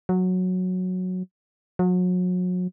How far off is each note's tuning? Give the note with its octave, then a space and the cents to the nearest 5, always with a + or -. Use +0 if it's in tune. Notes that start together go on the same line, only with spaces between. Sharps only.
F#3 -10
F#3 -35